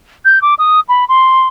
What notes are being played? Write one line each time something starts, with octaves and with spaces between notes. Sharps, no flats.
G6
D6
D#6
B5
C6